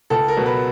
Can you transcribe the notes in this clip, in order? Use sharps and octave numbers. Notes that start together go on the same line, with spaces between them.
C#2 A4
A#4
B2 F#3
B4